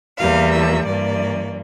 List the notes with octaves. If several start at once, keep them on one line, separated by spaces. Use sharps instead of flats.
E2 E3 G3 A#3 F5
E5
G2 E3 A#3 D5